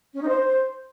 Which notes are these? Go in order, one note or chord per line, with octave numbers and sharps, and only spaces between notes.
C#4
D#4
C5